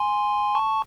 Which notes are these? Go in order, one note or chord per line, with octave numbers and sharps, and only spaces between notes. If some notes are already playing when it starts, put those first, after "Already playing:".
Already playing: G#5 C6
A5 C#6